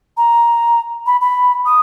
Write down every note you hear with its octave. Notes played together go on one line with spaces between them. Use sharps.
A#5
B5
B5
D#6